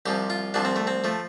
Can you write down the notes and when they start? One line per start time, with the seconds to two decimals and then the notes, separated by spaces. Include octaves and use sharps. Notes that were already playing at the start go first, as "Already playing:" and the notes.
0.06 C2 C3 F3 G4
0.30 F4
0.54 C2 C3 F3 D4
0.65 C4
0.76 A3
0.87 C4
1.04 F3 A3